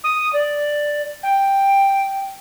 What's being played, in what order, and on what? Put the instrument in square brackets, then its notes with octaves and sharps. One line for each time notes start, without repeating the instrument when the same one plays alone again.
[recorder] D#6
D5
G5